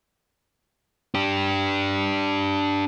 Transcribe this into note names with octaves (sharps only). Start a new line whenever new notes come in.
D4 G4